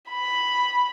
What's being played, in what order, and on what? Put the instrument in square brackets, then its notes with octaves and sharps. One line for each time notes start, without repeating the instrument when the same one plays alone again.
[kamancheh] B5